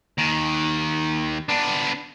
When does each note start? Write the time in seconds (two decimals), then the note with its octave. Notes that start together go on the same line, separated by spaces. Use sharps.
0.18 D#2 D#3
1.49 B3 D4